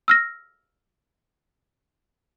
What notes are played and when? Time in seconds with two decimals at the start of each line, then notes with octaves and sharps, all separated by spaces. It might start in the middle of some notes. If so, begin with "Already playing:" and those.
0.08 E6 F6 A#6